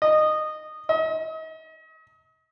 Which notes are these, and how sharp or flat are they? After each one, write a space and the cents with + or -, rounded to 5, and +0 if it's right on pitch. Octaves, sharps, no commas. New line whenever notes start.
D#5 -15
D#5 +40